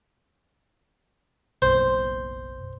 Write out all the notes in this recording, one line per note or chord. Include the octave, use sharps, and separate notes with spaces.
F#1 B1 C5